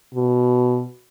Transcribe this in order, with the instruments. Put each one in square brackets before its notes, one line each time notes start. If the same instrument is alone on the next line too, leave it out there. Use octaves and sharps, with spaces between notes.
[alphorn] B2